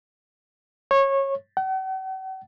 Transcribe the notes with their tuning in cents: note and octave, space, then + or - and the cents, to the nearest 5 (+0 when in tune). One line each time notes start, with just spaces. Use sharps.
C#5 -20
F#5 +45